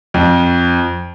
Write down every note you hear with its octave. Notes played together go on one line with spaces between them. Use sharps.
F2